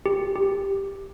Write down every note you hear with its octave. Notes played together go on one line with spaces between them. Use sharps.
G4
G4